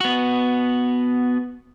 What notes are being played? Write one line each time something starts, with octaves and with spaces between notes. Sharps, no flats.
B3 F#4